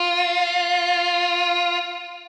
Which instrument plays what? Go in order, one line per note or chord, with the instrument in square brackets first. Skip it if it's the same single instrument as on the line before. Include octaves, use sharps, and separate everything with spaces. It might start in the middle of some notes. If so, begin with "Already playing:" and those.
Already playing: [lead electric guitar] F4